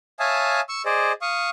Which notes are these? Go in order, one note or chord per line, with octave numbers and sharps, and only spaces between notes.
C#5 E5 F5 G#5 A5 D#6
C#6 E6
G#4 C5 D5 D#5
F5 C#6 D#6